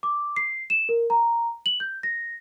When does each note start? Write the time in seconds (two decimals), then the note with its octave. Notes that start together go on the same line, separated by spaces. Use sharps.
0.03 D6
0.36 C7
0.70 E7
0.89 A#4
1.10 A#5
1.66 F#7
1.80 G6
2.03 A#6